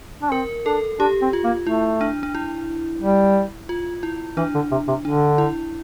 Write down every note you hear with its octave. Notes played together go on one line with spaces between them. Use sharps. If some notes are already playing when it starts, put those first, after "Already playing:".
D4
C4 A#4
D4 A4
D4 G4
C4
F4
A#3
A3 E4
D4
D4
E4
G3
F4
E4
E3 D4
D3
C3
C3
D3 D4
E4